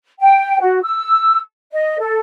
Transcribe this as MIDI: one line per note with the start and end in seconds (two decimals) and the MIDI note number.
0.20 0.58 79
0.60 0.78 66
0.83 1.37 88
1.72 1.98 75
1.98 2.20 69